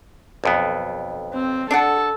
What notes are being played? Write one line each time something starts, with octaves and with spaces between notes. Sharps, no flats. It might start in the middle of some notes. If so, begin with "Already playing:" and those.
B1 F2 B3
C4
D4 A4 D5 F#5